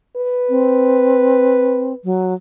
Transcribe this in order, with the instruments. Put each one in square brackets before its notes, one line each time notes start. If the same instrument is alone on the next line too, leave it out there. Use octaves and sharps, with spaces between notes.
[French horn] B4
[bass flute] C4
F#3